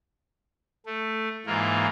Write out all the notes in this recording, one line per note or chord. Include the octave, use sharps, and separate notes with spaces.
A3
G#2 E3 A#3 F4